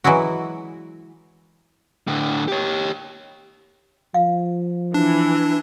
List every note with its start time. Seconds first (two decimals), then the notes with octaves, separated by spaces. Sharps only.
0.04 E3 F#3 G#3 E4 F#4
2.07 A2 D3
2.48 G4 C#5
4.14 F3 F5
4.94 E3 D4